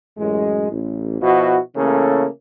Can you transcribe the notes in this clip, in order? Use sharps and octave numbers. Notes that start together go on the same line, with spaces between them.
A1 F#2 G#3
A1
B2 F3 E4 F#4
C#3 E3 A3 A#3 C#4 A4